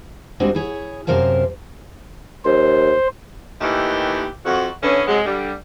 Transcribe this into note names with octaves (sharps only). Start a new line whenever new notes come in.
G3 G#3 C4 D4 F#4
E4 G#4 C#5
F#2 C3 A#4 C5 F5 A5
D#2 C5
D#2 D#3 E3 A3 G4
F2 F#4
D3 E3 B3 C#4
C3 F#3 G#3
D3 G3